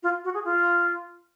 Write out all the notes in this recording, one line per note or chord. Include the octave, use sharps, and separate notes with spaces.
F4
F#4
G#4
F4